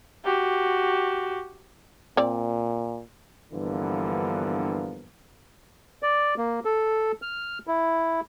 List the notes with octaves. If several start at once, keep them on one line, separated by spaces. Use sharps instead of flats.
F#4 G4
A#2 C4 D5
G2 D3 E3 F3 A#3 B3
D5
A#3
A4
F6
E4